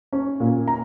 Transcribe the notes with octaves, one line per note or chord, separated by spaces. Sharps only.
C#4
A#2
A#5